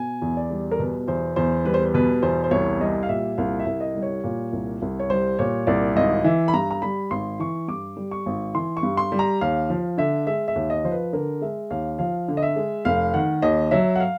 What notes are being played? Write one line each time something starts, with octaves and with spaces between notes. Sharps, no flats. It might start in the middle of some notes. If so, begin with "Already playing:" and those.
Already playing: B2 G#5
E2
D5
G3
A#4
B2 B4
E2 C5
E2 C5
G3 B4
C5
B4
B2 B4
E2 C5
C5
C2 C#5
G3 D#5
F5
A#2 E5
C2 F5
E5
C2
D#5
G3
C#5
A#2
C2
C2
C#5
G3 C5
A#2 C#5
C2 D5
G#1 D#5
E3 E5
B5
G2 A#5
A#5
G3 B5
G#1 C6
E3 C#6
G2 D6
G3
C#6
G#1
E3 C6
C#6
G2
C6
G3
A#5
D#2 F5
F3
D3 E5
G#3 E5
E5
D#2
D#5
F3 C5
B4
D3 A#4
G#3 E5
D#2 F5
F3 F5
D3
D#5
E5
G#3
F1 F5
D#3 F#5
D#2 D#5
F#3 E5
F#5
F5